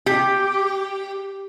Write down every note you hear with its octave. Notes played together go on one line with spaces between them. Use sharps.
G4